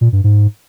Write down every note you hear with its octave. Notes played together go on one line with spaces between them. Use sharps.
A#2
G2
G#2